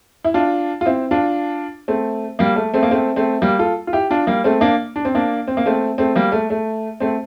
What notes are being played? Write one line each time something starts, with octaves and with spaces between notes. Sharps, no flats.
E4
D4 F4
F4
C4 E4
D4 F4
A3 C4
G3 A#3
A3
A3 C4
A#3
A3 C4
A3 C4
G3 A#3
F4 A4
F4
E4 G4
D4 F4
G3 A#3
A3 C4
A#3 D4
D4
C4
A#3 D4
C4
A#3
A3 C4
A3 C4
G3 A#3
A3
A3
A3 C4